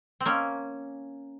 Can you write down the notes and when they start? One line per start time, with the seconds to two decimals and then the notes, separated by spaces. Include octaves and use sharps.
0.20 C4
0.26 A#3 C#4